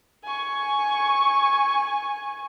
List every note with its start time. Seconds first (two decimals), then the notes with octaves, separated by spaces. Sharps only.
0.24 G#5 C#6